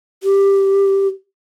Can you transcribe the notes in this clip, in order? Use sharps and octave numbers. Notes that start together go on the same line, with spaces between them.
G4